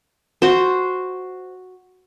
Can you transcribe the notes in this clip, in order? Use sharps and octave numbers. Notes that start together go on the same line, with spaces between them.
F#4 C5